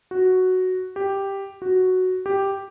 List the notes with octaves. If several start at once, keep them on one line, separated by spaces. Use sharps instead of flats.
F#4
G4
F#4
G4